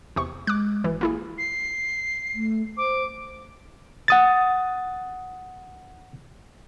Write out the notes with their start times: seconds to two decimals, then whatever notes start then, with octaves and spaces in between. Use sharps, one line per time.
0.16 E2 C3 C#6
0.47 G#3 D6 F#6
0.84 G#1 E3
1.01 A#3 E4 G#4
1.38 C7
2.34 A3
2.77 C5 D6
4.08 F#5 D#6 A6